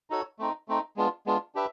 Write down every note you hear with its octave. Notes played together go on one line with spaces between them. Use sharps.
D#4 F#4 A4 C#5
A3 C4 D#4
A3 C4 D#4
G#3 B3 D4 F4
G#3 B3 D4 F4
D4 G4 B4 E5